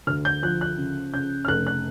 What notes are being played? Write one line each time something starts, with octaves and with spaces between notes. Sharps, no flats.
D2 F6
G6
F3 F#6
F#6
C#3
C#3 G6
F6
F1 F#6
F#6